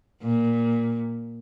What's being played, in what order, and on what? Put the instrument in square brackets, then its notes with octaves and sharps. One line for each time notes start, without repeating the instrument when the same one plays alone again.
[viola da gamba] A#2